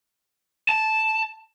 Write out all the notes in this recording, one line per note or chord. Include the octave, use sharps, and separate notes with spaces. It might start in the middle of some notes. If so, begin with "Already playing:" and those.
A5